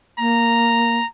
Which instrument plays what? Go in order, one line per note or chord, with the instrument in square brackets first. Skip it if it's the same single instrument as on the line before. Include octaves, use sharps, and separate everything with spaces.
[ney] A#3 [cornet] A#5